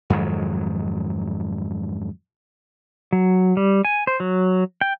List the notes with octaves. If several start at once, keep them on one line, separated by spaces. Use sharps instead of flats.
F2 G#2 D#3 F#3
F#3
G3
G#5
C5
F#3
G5